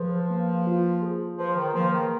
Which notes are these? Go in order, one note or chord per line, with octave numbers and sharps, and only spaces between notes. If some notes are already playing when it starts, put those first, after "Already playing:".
Already playing: F3 G#4 B4
A#3
F4
G#4
F3 B4
D#3
F3 A#3
D#3